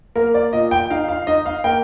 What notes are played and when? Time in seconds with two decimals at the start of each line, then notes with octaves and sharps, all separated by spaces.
0.15 A#3 A#4
0.34 D5
0.53 A#2 D#5
0.71 G5
0.90 D#4 F5
1.09 F5
1.27 D#4 D#5
1.46 F5
1.64 A#3 G5